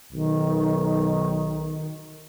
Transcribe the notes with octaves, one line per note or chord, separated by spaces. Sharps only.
B1 D#3